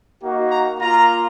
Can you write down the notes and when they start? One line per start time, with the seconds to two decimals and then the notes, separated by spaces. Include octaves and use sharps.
0.22 A#3 D#4 F#4
0.50 A#5
0.80 A#3 F4 A#5